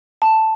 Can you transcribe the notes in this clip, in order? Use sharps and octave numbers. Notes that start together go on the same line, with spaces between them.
A5